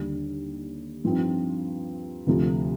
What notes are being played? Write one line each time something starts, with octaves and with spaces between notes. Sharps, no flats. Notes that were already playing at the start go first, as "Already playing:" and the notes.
Already playing: D#2 D3 G3
G2 F3 C4 D#4
D2 C3 F3